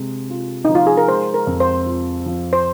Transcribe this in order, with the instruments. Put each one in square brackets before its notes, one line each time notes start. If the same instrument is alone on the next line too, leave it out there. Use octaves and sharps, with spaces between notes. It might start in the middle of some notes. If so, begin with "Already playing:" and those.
Already playing: [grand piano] C3 G#3
F4
[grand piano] F3 [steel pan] D#4
[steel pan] F4
G#4
A#4
[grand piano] G#3 [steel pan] C5
[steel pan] A#4
[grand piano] F2
[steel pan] C5
[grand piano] F4
F3
[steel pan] C5